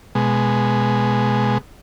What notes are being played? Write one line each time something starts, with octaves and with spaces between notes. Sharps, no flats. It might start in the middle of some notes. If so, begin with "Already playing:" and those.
B2 G#3